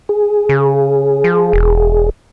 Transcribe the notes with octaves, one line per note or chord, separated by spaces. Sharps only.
G#4
C#3
F3
E1